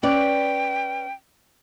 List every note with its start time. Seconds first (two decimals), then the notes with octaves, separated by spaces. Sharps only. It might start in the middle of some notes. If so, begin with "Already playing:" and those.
0.03 C#4 B4 D5 G5